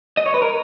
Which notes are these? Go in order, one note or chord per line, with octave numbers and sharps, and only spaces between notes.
D#5
C#5
B4
A#4